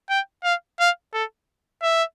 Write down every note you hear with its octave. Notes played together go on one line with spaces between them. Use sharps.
G5
F5
F5
A4
E5